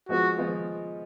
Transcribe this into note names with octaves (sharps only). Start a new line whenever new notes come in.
F3 G#3 B3 F4 F#4
F3 G#3 B3 F4